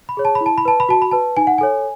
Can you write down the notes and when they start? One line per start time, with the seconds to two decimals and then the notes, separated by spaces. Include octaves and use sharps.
0.09 B5
0.17 G#4 C#5
0.25 A5
0.35 B5
0.41 E4
0.46 A5
0.58 B5
0.65 B4 A5
0.80 B5
0.89 F#4 A5
1.02 B5
1.11 B4 A5
1.37 D#4 G#5
1.47 F#5
1.58 A4 C#5 G#5